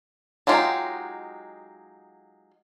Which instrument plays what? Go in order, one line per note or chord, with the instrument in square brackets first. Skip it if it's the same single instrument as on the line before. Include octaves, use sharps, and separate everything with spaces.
[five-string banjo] F#3 G#3 D#4 F4 G4